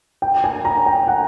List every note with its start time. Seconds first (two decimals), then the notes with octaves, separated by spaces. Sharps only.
0.22 G5
0.44 G#5
0.65 A#5
0.86 G5
1.08 F#5